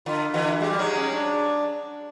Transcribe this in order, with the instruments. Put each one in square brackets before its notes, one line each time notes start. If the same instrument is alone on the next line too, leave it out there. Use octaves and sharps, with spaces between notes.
[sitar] D3 [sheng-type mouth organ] F4
[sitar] D3 E3 [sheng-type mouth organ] F#4
[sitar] G#3 [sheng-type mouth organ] G4
[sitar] G3
[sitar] F#3 G#3 [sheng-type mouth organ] D#4
[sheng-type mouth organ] C#4
D4